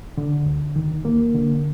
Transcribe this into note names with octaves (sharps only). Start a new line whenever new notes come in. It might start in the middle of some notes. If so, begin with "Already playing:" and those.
D3
D2
D#3
A#3
D3